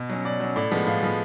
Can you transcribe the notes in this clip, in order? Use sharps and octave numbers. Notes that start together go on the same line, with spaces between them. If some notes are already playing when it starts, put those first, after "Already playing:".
Already playing: B2
F#3 C#4
B2 D5
F#3 C#4
A2 D5
F3 G#3 B3
A2 F5
F3 G#3 B3